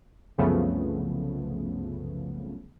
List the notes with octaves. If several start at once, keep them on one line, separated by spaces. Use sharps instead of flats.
C2 F#2 C#3 F3 A3 B3